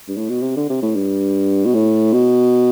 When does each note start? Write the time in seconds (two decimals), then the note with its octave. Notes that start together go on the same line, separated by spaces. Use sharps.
0.08 G2
0.17 A2
0.29 B2
0.42 C3
0.57 D3
0.70 C3
0.83 A2
0.95 G2
1.66 B2
1.74 A2
2.13 B2